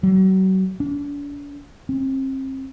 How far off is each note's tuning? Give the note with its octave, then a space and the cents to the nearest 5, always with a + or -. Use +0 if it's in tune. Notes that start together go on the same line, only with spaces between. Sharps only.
F#3 +35
D4 -40
C4 +35